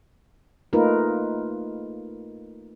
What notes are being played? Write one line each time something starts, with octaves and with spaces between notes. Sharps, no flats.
A3 A#3 D#4 F4 A#4 B4